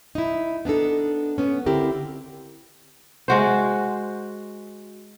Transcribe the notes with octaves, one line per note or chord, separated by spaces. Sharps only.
D#4 E4
B3 D4 D#4 A4
B3 C#4
D3 C4 E4 G4 A#4
G#3 F#4 C5